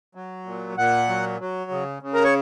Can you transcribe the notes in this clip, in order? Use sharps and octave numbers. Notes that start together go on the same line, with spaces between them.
F#3
A#2
A#2 F#5
F#3
F#3
C#3
C#3
A#4
C#5